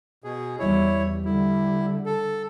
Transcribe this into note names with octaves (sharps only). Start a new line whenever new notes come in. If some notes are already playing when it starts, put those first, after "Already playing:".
B2 G#4
E2 G3 E4 C#5
D3 G3 E4
A4